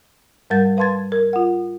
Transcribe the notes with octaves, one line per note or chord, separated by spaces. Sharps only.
G#2 G3 A#4 F#5 G6 A6
B4 F5 A5 C6 G#6 A6
A#4
F4 F#5